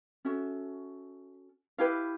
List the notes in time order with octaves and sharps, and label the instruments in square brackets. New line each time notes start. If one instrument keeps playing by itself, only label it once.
[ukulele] C#4 F#4 A4 E5
E4 G4 B4 F5